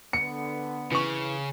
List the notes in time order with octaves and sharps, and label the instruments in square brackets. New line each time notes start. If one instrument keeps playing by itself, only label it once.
[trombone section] D3 B3 [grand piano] C#7
[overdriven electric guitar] C#3 [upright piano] E3 C#6